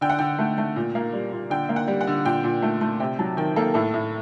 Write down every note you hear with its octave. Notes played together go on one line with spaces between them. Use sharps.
D3 G5
F#5
D3 G5
A3
A3
A#2
A#3
G3
A#2
D3 G5
A#3
F#5
G3
F#5
D3
A#2 G5
A#2
A3
A3
C3 G5
F#3 A5
D#3 G5
A#3 A4
A2 A4
A2